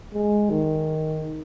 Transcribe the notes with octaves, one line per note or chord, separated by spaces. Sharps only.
G#3
D#3